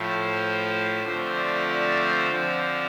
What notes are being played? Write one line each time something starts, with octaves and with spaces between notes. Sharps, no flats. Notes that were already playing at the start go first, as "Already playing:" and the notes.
Already playing: A2 F3 A3
C5
D3 F3 A3 C4
D5
D5
C5
D3 F3 C4